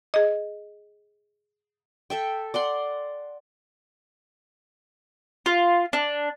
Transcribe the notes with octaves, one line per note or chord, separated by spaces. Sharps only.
G#4 D#5
A4 E5 G5
D5 F#5 C6
F4
D4